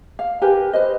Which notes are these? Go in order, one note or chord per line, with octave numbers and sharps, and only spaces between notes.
F5
G4 A#4 B4 G#5
B4 C5 D#5